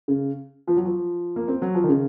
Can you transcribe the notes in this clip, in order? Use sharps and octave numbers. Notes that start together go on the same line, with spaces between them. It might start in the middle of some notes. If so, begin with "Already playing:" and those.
C#3
F3
F#3
F3
A#3
C4
F#3
F3
D#3
C#3